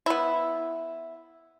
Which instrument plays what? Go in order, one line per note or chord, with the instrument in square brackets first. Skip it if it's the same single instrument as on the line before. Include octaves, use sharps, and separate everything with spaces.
[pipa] B3 E4